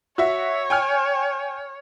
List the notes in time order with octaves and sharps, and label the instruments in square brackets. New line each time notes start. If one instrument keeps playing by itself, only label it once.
[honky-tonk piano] F#4 E5 [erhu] C#5
[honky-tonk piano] G5 G#5 F6